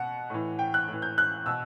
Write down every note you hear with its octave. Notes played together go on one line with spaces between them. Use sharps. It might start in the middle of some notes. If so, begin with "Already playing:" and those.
Already playing: B2 F#5
A2 E3
G5
F#6
A2 E3
G6
F#6
B2 E6